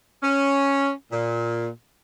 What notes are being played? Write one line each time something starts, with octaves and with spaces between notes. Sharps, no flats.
C#4
A#2